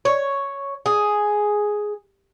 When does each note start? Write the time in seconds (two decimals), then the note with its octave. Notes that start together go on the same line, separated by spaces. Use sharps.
0.05 C#5
0.86 G#4